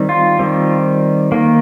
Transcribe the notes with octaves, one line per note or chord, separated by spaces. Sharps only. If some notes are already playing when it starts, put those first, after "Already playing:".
Already playing: D#3 G3 C4
F4
D#3 G3 C4
D#3 A#3